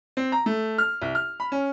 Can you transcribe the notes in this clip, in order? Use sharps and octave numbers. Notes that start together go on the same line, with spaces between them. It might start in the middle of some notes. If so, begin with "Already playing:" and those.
C4
A#5
A3
F6
C2
F6
B5
C#4